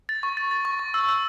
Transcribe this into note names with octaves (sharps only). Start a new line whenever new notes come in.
A6
C#6
A6
A6
C#6
C#6
E6
E6